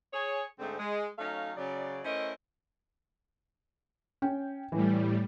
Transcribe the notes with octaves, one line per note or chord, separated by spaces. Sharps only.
G#4 C#5
G#2 D3 G#3 A3 C4
G#3
F#3 A3 C#4 D#4 F5
C#3 F#3 D5
A3 C#4 E4 A#4 C5 D#5
C#4 G5
A2 E3 G3